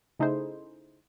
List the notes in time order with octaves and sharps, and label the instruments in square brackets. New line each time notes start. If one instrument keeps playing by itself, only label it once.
[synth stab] C#3 A3 D#4 E4 G#4 C5